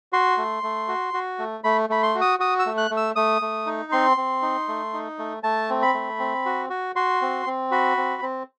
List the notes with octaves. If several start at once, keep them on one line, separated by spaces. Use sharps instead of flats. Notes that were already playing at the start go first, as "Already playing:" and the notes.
F#4 C6
A3
A3
F#4
F#4
A3
A3 B5
A3 B5
C6
F#4
D#6
F#4 D#6
E6
A3
F#6
A3
E6
A3 D#6
A3
D#4
C4 C6
C4
D#4
A3
D#4
A3
A3 A5
C4
B5
A3
C4
F#4
F#4
F#4 C6
C4
C4
F#4 B5
C4
C4